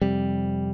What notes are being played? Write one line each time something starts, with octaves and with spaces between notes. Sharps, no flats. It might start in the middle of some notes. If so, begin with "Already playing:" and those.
F2 C3 G3